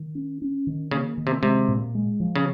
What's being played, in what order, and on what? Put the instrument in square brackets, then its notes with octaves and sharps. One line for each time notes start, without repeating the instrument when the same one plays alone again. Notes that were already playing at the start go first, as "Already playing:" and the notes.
Already playing: [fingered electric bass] D#3
C#4
C#4
D#3
[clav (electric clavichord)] C#3 [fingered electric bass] A#3
[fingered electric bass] D#3
[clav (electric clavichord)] C3
[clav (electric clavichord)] C3 [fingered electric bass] G#3
[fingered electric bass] A#2
G#3
F3
[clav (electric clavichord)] C#3